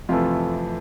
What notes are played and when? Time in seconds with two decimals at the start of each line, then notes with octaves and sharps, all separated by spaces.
0.09 F2 C3 E3 A3 F4